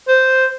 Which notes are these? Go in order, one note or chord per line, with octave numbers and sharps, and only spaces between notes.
C5